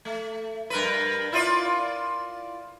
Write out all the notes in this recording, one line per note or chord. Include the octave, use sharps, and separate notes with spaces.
A3
G2 A#4 B4
E4 F4 D5